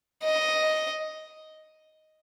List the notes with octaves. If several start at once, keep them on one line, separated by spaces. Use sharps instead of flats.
D#5